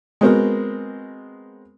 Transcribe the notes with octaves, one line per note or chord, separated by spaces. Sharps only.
G#3 B3 C4 F#4 A#4